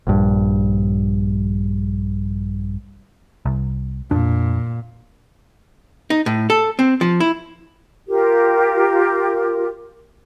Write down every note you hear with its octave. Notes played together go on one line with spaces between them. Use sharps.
A#1 G2
C2
F2 A#2 D4
D#4
A2
A4
C4
F3
E4
F4 G4 A#4